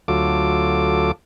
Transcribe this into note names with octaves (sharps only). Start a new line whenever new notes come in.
D2 F#3 F4 A4 D6